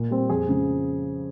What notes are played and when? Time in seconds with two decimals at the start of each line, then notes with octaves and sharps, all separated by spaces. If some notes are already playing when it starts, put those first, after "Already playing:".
Already playing: A#2
0.11 G3 C4
0.30 F2 G#4
0.49 C#3 F3